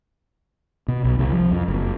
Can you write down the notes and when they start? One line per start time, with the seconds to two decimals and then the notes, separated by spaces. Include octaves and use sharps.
0.88 B2
1.04 B1
1.19 C2
1.32 F3
1.51 F2
1.68 F#1